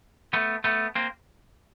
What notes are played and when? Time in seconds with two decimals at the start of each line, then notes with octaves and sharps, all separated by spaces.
0.33 A3 B3
0.64 A3 B3
0.95 A#3 C4